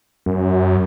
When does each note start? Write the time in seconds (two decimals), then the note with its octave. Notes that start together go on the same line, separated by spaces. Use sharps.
0.26 F#2